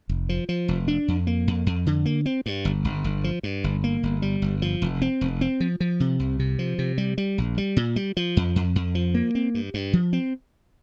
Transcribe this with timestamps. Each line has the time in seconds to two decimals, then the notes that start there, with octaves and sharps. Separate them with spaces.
0.09 F1
0.29 F3
0.49 F3
0.68 F1
0.88 D4
1.08 F2
1.27 A#3
1.47 F2
1.66 F2
1.87 D3
2.05 A#3
2.26 C4
2.46 G2
2.65 G1
2.84 G1
3.04 G1
3.24 F3
3.43 G2
3.64 G1
3.84 A#3
4.03 G1
4.22 G3
4.42 G1
4.62 F3
4.82 F1
5.02 C4
5.21 F1
5.41 C4
5.60 F3
5.80 F3
6.00 C3
6.19 C2
6.39 C3
6.59 F3
6.78 C3
6.98 G3
7.18 G3
7.38 A#1
7.58 G3
7.77 A#2
7.96 G3
8.17 F3
8.37 F2
8.56 F2
8.76 F2
8.95 F3
9.15 A#3
9.35 C4
9.54 G2
9.74 G2
9.93 F3
10.13 C4